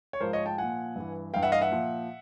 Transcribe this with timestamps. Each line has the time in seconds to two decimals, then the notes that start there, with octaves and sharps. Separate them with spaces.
0.13 C#5
0.20 G#2 F3 A#4 C5
0.33 C#5 D#5
0.46 G5 A5
0.58 A#2 F3 F#5 G#5
0.96 G2 E3
1.33 G2 E3 F5 G5
1.42 E5 F#5
1.52 D#5 F5
1.61 E5 F#5
1.71 A#2 F3